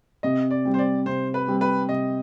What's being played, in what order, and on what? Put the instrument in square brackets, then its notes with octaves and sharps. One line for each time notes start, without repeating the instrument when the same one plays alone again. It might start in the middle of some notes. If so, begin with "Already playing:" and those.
[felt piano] C3 [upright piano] D#5
[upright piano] D5
[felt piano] G3 C4
[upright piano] C5
D5
[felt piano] C3 [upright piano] C5
[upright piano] B4
[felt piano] G3 C4
[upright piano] B4
[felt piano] C3 [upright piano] D#5